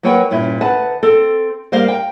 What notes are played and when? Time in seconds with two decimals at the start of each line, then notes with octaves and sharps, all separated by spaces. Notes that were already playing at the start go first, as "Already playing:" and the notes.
0.03 F#3 A#3 B4 C#5 F#5 G5
0.30 G2 A#2 C#4 E4
0.61 D2 B4 F#5 A5
1.03 C4 A4
1.72 G3 A#3 C5 F5
1.88 G5